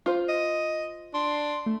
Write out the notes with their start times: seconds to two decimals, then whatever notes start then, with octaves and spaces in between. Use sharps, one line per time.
0.06 F4 C5
0.29 D#5
1.14 D4 C6
1.66 A3